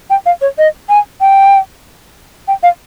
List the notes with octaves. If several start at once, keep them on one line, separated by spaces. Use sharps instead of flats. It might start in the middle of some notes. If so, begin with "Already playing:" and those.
G5
F5
C#5
D#5
G#5
G5
G5
F5